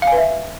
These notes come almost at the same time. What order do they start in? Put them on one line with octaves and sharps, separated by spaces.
F5 G#5 B4 E5